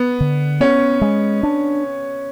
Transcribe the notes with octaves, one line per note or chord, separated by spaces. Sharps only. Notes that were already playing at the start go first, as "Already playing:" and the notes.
Already playing: B3
D3
B3 C#4
G#3
D4